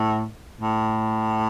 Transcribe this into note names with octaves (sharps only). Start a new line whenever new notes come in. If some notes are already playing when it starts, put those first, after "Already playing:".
Already playing: A2
A2